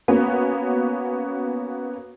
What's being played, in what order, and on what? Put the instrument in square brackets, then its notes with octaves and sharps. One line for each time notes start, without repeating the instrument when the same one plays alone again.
[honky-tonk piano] A#3 B3 C#4 F#4